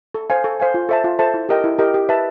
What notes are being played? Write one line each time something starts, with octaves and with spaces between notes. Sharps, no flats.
A4
C5 F5 G#5
A4
C5 F5 G#5
F4
A4 C5 E5 A5
F4
A4 C5 E5 A5
E4
G4 A#4 D#5 G5
E4
G4 A#4 D#5 G5
G4
B4 E5 A5